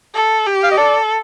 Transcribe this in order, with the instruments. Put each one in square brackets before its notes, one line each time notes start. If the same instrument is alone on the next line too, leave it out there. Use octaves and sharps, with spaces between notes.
[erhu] A4
G4
[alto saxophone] F5
D#5
[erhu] A4 [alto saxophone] D5